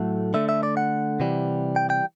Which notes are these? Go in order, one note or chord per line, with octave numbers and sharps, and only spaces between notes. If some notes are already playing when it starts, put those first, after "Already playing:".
Already playing: A2 F#3 A3 F#5
D3 A3 E5
E5
D5
F#5
C3 E3 G3
G5
G5